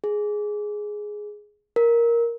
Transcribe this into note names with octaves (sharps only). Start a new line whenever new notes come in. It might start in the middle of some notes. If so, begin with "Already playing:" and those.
G#4
A#4